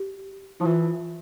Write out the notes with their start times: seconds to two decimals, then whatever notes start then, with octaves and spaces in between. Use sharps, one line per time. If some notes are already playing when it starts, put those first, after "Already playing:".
Already playing: G4
0.60 F3 E4
0.65 E3 F4